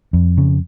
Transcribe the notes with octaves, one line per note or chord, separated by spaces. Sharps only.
F2
C#3